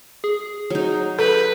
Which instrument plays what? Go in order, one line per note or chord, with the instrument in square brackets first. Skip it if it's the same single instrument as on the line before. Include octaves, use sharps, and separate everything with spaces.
[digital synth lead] G#4
[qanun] F#3 D#4
[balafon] A4 [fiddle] B4